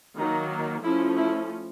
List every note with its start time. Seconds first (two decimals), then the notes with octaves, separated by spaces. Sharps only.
0.18 D#3 F#3 A#3 D#4
0.83 F3 A3 C#4 E4
1.17 E4